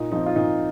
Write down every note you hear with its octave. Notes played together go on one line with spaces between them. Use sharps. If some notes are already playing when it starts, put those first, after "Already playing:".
Already playing: A#2 D#4
F3 C4 D#4
F4
A#2 D#4